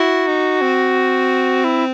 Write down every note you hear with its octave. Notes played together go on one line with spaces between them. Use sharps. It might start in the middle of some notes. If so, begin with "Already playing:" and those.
Already playing: E4 F#4
D#4
C4
E4